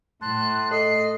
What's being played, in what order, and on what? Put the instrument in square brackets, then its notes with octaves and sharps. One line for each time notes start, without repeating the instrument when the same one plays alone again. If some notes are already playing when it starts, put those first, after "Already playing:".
[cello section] A2 [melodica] A5 C6 [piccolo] F#6
[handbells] A4 [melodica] D#5 [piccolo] C7